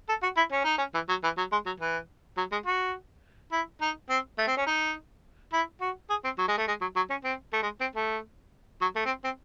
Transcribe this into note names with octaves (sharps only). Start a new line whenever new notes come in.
A4
F#4
E4
C#4
D#4
C#4
E3
F#3
E3
F#3
G#3
F#3
E3
F#3
G#3
F#4
E4
D#4
C4
A3
C4
C#4
D#4
E4
F#4
G#4
C4
F#3
G#3
A3
G#3
F#3
F#3
C#4
C4
A3
G#3
C4
A3
F#3
A3
C4
C4